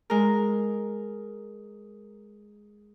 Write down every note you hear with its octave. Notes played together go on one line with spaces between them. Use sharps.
G#3 A#4